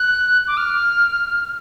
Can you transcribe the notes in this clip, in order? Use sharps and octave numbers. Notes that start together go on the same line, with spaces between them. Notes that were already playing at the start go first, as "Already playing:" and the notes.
Already playing: F#6
D6
F6